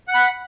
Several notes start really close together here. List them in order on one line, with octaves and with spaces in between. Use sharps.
F#5 F#6 B5